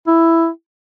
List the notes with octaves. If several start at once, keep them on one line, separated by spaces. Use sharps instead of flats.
E4